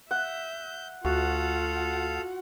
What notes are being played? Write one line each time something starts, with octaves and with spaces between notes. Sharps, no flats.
E5 F#5 G6
D2 F4 F#4 A4 F5 F#5